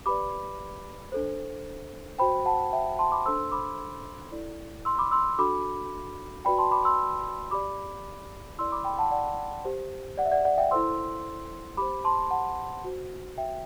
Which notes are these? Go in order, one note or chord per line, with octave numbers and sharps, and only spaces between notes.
G4 B4 D5 B5 D6
D4 A4 C5
F#4 C5 G5 B5
F#5 A5
E5 G5
A5 C6
B5 D6
D4 A4 C5 C6 E6
B5 D6
E4 A4 D5
C6 E6
B5 D6
C6 E6
D4 F#4 A4 B5 D6
F#4 B4 D5 G5 B5
A5 C6
B5 D6
C6 E6
G4 D5 B5 D6
E4 A4 D5 C6 E6
B5 D6
G5 B5
F#5 A5
D5 F#5
G4 C5
D5 F#5
E5
D5 F#5
D5 F#5
E5 G5
E4 A4 C5 C6 E6
G4 C5 B5 D6
A5 C6
F#5 A5
F#4 C5
E5 G5